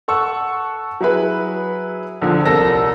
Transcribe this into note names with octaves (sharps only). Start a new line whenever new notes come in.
A4 F#5 C#6 E6
F#3 E4 G#4 B4
A#1 D3 F3
D#1 C2 A4 A#4 E6 A#6